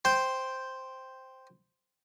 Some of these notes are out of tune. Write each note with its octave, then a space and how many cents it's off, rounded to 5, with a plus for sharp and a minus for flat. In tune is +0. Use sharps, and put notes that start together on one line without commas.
C5 +0 G5 +0